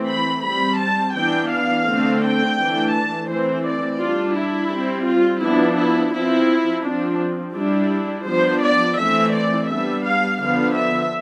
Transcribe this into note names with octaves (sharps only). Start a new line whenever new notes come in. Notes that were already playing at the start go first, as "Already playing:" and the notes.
Already playing: E3 A3 C4
B5
G3 C4 B5
A5
E3 B3 D4 G5
F5
D3 A3 C4
G5
E3 A3 D4
A5
E3 A3 C4 C5
D5
G3 D4 F4
E4
G3 C4
F4
F3 B3 D4 E4
E4
F3 C4 E4
F3 C4 D4
G3 D4 E4
F3 B3 D4 C5
D5
E3 A3 C4 E5
D5
G3 B3 D4 E5
F5
D3 F3 B3 D4 F5
E5